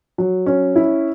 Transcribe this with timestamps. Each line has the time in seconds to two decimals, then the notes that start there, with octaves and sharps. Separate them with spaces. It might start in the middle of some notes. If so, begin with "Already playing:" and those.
0.18 F#3
0.46 C#4
0.76 E4